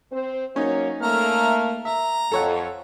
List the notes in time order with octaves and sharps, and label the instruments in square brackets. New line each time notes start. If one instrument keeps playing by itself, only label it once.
[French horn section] C4 C5
[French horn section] F#3 A#3 C#5 [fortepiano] C#4 D#4
[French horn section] A3 A#3 [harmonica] E5 A#5 F6
[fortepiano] E5 [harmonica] A#5
[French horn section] F2 [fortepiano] A4 C#5 F#5